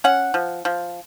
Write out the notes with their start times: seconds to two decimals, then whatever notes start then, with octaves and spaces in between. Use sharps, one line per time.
0.04 C#4 F#5
0.34 F3
0.65 F3